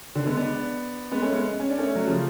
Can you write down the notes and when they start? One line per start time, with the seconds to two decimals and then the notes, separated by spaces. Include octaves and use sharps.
0.15 D3
0.26 G#3 B3
0.37 B3 D4
1.11 G#3 B3
1.22 A3 C#4
1.33 G#3 B3
1.60 C#4
1.69 D4
1.78 A3 C#4
1.95 F#3
2.07 C#3 F3